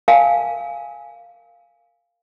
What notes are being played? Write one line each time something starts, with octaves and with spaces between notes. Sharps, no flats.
A#4 F5 G#5 A5